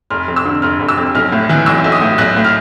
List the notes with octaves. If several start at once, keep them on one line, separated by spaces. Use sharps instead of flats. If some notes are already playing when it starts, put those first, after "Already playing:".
F1 F6
F2
E6
D3
F1 F6
F1
E6
F2
B1 F6
A2
E3 F#6
B1 E6
B1
D#6
A2
B1 F#6
A2
F6